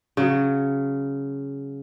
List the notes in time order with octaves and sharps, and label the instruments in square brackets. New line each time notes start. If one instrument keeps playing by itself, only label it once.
[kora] C#3 F#3